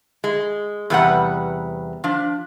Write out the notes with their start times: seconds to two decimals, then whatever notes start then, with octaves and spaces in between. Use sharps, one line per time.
0.24 G#3
0.90 E2 C3 G3 B4 F#5
2.04 F3 D4